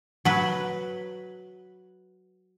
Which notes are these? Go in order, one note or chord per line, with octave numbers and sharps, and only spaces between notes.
F#3 B4